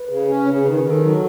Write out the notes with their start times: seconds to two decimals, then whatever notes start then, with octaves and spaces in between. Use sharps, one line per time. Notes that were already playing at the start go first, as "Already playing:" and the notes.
Already playing: B4
0.09 C#3
0.28 C#4
0.46 C#3
0.65 D#3 B4
0.84 D#3
0.90 A4
1.02 F#3